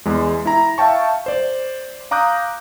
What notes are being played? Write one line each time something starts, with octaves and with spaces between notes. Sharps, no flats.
E2 G#3
E4 A#5
E5 F5 G5 A5 C#6
C5 D5
F5 A#5 D6 D#6 F#6 G6